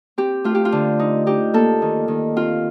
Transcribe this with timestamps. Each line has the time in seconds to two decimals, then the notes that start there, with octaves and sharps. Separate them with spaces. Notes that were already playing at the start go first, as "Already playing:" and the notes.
0.18 C4 G4
0.44 A3 F4
0.55 G4
0.65 F4
0.72 D3
0.99 D#4
1.26 D#4 G4
1.54 A#3 A4
1.82 D#3
2.08 D#3
2.36 C4 F4